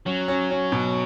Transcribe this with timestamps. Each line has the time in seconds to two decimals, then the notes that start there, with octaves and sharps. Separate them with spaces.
0.06 F#3 C#4
0.28 C#4
0.51 C#4
0.72 B2